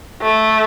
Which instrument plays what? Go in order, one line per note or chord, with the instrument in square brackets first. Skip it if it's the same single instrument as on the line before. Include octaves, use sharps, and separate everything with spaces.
[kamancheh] A3